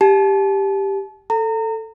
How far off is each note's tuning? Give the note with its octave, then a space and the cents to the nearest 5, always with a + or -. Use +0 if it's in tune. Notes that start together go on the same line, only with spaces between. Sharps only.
G4 +5 A5 -35
A4 +5 A#5 -30